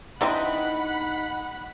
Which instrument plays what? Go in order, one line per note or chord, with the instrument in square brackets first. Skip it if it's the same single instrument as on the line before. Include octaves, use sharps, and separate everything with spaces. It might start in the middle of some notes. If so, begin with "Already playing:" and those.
[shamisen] D3 E3 C4 [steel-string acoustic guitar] D#4 D#5 [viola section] F#5 B5